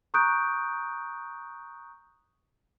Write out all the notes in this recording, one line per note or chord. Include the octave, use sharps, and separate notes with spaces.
A#5 C#6 D#6 F#6 G6 D7